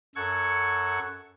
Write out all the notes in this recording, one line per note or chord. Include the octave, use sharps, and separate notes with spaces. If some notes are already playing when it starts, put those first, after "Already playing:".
F#2 A4 F#5 C#6 G#6